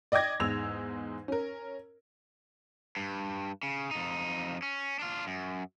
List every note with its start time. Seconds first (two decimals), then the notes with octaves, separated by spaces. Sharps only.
0.12 D5 D#5 G5 D6 G#6 A#6
0.40 E2 G#2 G#3 E6 F7
1.28 C#4 A#4
2.97 G2
3.63 C#3
3.91 F2 D#4
4.63 C#4
4.99 D4 F4
5.27 F#2